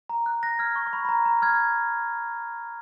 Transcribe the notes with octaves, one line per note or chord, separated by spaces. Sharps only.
A#5
F#6
F#6 A#6
F6 G#6
C#6
C#6
B5
B5
A#5
A#5
F6 G#6